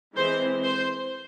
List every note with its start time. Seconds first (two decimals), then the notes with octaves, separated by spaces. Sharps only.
0.16 E3 G#3 C4 C5
0.65 C5